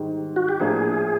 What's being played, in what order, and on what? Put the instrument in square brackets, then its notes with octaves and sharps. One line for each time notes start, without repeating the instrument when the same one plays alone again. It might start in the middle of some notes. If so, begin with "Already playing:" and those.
Already playing: [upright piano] G#2 D#3 G3
[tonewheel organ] F#4
G4
[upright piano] A2 F3 A#3 D4 [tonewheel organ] G#4